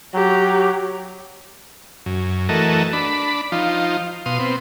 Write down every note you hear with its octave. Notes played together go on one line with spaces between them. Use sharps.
F#3 G4 A#5
F#2
E3 A3 F#4 A4 A#4 D#5
D4 B5
F3 D#4 F4
B2 F5 C6 D#6
B3 C4